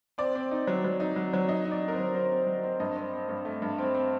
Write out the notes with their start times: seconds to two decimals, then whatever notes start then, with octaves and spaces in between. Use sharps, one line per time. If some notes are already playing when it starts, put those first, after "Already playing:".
0.18 C4 D5
0.35 C4
0.51 D#4
0.67 F#3
0.85 F#3
1.00 D#4
1.16 F#3
1.33 F#3
1.49 D#4 D#5
1.65 D#4
1.71 D5
1.82 D#4
1.88 A#4
1.93 C5
1.98 F#3
2.15 F#3 C5
2.31 C4
2.47 F#3
2.63 C4
2.80 G2 D#5
2.96 C4
3.13 C4
3.29 G2
3.45 A3
3.62 G2
3.78 C4
3.95 C4